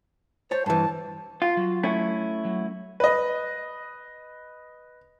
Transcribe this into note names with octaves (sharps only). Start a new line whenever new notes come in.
C5 C#5 A5
G2 E3 A5
F4 F5
F#3
A3 C#4 E4
F#3
B4 D#5